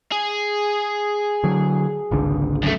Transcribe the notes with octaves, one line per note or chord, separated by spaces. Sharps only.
G#4
D3 F#3
G#1 C#2 D3
F#2 A3